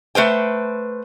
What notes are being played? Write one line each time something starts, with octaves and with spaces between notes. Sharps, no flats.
A3 B4 C5 G5